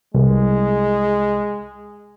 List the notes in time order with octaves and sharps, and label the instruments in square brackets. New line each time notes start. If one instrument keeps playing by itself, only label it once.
[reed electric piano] C2 [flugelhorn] G#3